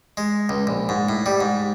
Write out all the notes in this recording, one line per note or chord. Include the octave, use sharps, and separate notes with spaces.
G#3
C#2
A#1
G#2
A2
G3
G#2